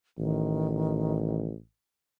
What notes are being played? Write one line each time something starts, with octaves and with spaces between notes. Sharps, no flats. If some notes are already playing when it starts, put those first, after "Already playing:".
A1 D#3